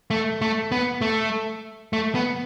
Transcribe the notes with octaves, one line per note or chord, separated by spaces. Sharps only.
A3
A3
B3
A3
A3
B3